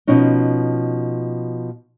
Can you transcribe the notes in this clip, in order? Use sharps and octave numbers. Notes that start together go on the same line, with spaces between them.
B2 F3 C#4 D#4